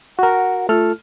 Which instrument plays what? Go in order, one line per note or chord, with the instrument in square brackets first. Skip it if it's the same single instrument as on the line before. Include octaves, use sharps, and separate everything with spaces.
[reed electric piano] F#4 A#4 [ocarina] F#5
[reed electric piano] A3 A4 F6 [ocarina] F4